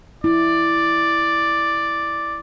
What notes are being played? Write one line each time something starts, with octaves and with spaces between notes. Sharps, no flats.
E4 D5